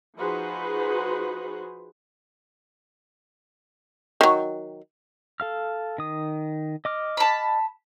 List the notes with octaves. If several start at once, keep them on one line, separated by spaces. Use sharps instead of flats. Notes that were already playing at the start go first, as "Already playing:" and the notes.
F3 D#4 F#4 G#4 B4 C5
D#3 F#3
A4 F5 F6
D#3 D#6
D#5 D6 F6
A5 B5